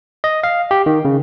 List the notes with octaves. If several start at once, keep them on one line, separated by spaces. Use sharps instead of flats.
D#5
F5
G4
D#3
C#3